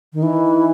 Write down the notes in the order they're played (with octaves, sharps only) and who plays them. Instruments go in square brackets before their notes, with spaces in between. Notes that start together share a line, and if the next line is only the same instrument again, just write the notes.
[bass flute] D#3
[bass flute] E3 [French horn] D#4